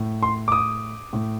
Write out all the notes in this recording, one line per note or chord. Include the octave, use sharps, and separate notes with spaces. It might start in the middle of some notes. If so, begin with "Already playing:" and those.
Already playing: A2
C6
D6
D#6
A2